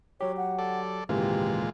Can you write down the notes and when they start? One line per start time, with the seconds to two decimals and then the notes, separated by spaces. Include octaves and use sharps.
0.21 F#3 G4 C#5
0.37 F#5
0.59 A4 D5
1.09 G#1 C#2 A#2 E3 G#3 F4 G4